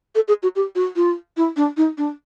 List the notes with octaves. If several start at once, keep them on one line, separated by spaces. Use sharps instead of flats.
A4
G#4
F#4
G4
F#4
F4
E4
D4
D#4
D4